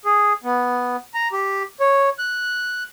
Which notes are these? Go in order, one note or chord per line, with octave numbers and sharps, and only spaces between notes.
G#4
B3
A#5
G4
C#5
F#6